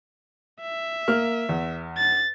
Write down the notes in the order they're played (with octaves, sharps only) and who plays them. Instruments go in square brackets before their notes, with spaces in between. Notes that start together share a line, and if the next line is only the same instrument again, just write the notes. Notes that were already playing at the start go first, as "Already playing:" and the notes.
[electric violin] E5
[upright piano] A#3 F6
E2
[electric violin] A6